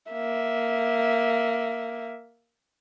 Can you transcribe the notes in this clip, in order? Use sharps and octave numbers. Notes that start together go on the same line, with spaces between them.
A#3 E5